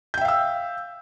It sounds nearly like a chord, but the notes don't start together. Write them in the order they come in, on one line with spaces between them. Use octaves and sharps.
G6 G5 E5 F5 E6